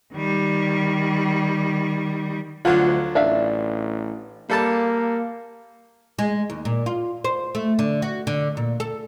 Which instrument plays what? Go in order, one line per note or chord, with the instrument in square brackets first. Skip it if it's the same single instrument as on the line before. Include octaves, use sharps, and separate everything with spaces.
[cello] D#3 G3
[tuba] D2 [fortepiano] D3 F3 F#3 [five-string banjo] F4
[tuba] A1 [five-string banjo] D4 E5 F5
[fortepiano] G3 A4 A5 [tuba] A#3
[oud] G#3
D#2
A#2
F4
C5
A3
D3
F#4
D3
A#2
A4